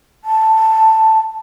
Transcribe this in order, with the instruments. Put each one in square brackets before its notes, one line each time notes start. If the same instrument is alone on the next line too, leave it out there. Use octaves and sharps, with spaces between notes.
[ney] A5